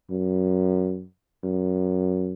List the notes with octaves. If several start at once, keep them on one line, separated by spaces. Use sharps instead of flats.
F#2
F#2